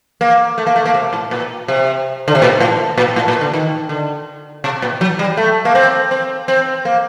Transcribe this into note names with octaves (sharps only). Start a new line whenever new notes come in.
A#3
A3
A#3
A3
A#3
C3
A2
A#2
C3
D3
C3
A#2
A2
A#2
A2
A#2
D3
D#3
D3
C3
A#2
F#3
G3
A3
A#3
C4
C4
C4
A#3